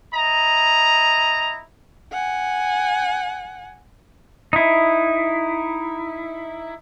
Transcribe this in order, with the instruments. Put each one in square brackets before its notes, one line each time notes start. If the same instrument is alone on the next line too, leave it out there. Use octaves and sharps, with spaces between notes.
[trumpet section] E4 D#5 A#5
[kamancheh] F#5 G#5
[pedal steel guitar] D#4 E4